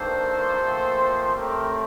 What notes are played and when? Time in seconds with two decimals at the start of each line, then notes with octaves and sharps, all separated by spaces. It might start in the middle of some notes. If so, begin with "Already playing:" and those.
Already playing: G2 D#3 G3 A#3 A4 C5
0.57 A#2 F3 A3 C4
1.35 A2 A3 C4 G4 A#4